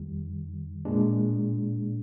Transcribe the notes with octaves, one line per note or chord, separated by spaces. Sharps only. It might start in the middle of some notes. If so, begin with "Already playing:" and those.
Already playing: F2 D#3 G3
A#2 G#3 D4